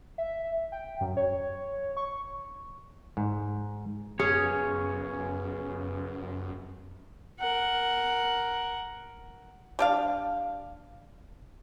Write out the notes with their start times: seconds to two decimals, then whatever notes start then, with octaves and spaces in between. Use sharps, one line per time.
0.18 E5
0.72 G5
1.01 F#2
1.17 C#5
1.97 C#6
3.17 G#2
4.19 F#2 C#3 B3 C#4 G#4 C#5
7.40 A#4 F#5
9.79 G3 D4 F5